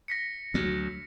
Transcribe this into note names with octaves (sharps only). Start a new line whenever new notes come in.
A#6 B6 C#7
D2 F#3